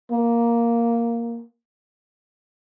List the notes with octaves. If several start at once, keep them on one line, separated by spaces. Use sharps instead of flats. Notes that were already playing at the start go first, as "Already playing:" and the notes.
A#3